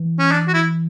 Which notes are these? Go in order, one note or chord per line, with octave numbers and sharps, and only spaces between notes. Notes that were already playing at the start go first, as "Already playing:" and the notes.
Already playing: E3
C#4
D4
F#4
E4